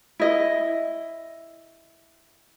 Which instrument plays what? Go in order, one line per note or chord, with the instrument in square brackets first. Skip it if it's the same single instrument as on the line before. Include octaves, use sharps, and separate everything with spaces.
[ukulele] E4 D#5